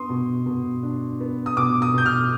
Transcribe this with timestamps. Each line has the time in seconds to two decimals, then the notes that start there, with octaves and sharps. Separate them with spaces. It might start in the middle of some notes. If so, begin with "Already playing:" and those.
Already playing: B3 D4 C6 D#6
0.09 B2
0.46 B2
0.83 D4
1.20 B3
1.46 D#6
1.57 B2 D6
1.82 D#6
1.94 B2 G6
2.06 F6